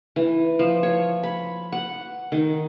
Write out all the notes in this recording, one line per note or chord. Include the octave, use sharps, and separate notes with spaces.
E3
F3
C#5
B5
F#5
D#3